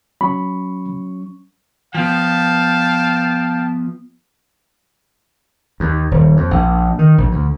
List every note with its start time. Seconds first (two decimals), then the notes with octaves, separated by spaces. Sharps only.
0.21 F#3 C#4 B5 C#6
1.95 F3 B3 F5 G5 A5
5.80 D#2
6.11 D#1
6.37 F2
6.51 A#1
6.99 D#3
7.18 A#1
7.31 D2